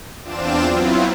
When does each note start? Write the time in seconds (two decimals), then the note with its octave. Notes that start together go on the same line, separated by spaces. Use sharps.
0.23 E2 C4 D4 F4 D6 E7
0.67 F#3 B3 C4 E4 F4